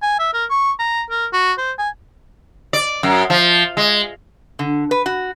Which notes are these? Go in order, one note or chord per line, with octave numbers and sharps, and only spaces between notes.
G#5
E5
A#4
C#6
A#5
A#4
F#4
C5
G#5
D5
F#2
F3
G#3
D3
B4
F#4